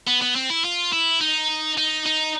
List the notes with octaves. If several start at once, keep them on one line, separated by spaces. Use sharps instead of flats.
B3
B3
C4
E4
F4
E4
D#4
D#4
D#4